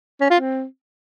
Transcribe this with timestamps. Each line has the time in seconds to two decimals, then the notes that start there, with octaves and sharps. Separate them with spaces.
0.21 C#4
0.30 F4
0.40 C4